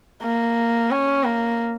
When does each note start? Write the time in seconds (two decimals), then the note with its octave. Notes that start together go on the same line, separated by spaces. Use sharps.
0.22 A#3
0.91 C#4
1.24 A#3